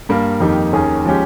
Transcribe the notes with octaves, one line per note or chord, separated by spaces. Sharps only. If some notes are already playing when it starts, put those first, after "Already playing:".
G2 G3 A#3
F2 D#3 A#3 D#4 G4
D#2 D#3 A#3 C#4 G#4
F3 G#3 C#4 G4